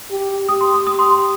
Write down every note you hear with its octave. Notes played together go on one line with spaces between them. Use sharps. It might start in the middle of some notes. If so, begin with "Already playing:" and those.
G4
G4 D#6
C6
D#6
D#6
C6
C6